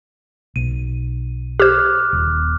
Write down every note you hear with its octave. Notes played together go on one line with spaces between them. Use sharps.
B1 D#7
G4 C5 D6 F6 F#6
D#1